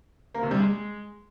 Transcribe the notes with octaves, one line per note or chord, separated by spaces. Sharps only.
A#3
C3
G3
G#3